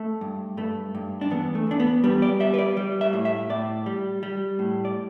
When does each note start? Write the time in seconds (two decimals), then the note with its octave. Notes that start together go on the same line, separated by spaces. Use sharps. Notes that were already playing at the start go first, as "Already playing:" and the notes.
Already playing: A3
0.21 G2
0.57 G2 A3
0.95 G2
1.21 D4
1.30 E2 B3
1.55 A3
1.67 E2 D4
1.80 B3
2.04 G3 B3
2.22 D5
2.40 G3 E5
2.54 B4
2.58 D5
2.77 G3
3.01 E5
3.13 A2
3.25 E5
3.50 A2 D5
3.86 G3
4.23 G3
4.59 A2
4.85 D5